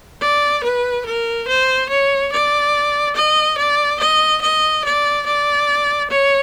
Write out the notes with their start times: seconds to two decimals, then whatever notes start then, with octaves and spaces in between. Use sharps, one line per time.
0.21 D5
0.64 B4
1.06 A#4
1.48 C5
1.89 C#5
2.33 D5
3.16 D#5
3.58 D5
4.00 D#5
4.42 D#5
4.85 D5
5.26 D5
6.11 C#5